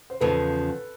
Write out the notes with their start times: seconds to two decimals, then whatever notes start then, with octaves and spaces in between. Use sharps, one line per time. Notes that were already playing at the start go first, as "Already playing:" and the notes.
0.10 C5
0.21 E2 C#3 F3 A4 B4